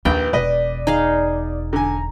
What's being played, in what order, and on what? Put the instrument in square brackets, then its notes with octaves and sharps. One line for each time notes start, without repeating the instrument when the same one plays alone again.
[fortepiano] A#1 [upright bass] D#2 [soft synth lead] B4 [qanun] G5
[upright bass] E1 [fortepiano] B4 D#5 [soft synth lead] D5
[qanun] D#4 G#4 F5
[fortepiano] D3 G#5 [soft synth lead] A#5